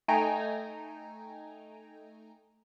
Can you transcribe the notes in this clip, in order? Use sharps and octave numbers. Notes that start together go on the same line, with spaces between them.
A3 D#4 G5 G#5 A#5 D7